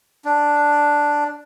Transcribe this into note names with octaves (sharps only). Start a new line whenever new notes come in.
D4